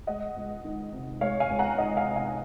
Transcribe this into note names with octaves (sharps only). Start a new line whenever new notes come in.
G#3 D#5 F#5
C#2
D#3
C3
G#3 C#5 F5
F5 G#5
C#2
F#5 A#5
D#3 D#5 F#5
F5 G#5
C3
F5 G#5
F#5